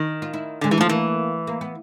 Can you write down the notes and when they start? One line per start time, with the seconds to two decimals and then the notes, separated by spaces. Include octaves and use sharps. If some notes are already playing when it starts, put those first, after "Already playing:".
Already playing: D#3
0.22 F4
0.34 E4
0.61 D3 G#3
0.71 E3
0.78 F3 A3
0.89 E3 A#3
1.47 A#3
1.61 B3